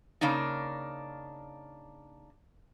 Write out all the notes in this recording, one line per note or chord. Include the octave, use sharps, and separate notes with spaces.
C#3 A#3 D4 D#4